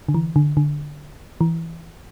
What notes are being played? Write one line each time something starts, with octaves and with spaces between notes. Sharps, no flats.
D3
E3
D3
D3
E3